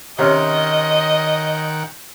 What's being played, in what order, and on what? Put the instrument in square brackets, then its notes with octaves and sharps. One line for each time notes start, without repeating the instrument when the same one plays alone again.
[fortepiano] C3 C#4 [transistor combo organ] D#3 F#5 G5 [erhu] D#5